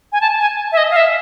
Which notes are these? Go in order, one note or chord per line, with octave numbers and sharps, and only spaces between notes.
G#5
A5
G#5
E5
D#5
F5
E5